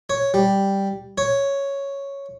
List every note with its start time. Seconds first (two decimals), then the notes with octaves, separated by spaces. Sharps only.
0.10 C#5
0.34 G3
1.18 C#5